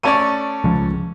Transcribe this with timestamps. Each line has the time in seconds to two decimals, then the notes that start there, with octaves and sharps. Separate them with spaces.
0.03 A3 C#4 D5 A5 C#6 D#7
0.64 C#2 F3 G#3